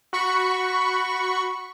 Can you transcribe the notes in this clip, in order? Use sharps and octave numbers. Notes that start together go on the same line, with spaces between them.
F#4 B5 C#6